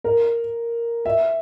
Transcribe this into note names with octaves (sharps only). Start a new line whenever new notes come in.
A#4
E5